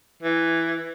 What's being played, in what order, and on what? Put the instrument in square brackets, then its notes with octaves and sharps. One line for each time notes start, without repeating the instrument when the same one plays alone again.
[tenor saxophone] E3